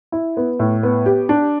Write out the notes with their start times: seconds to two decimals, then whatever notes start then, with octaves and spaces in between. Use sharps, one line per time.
0.12 E4
0.37 B3
0.59 A2
0.83 B3
1.06 G4
1.29 D4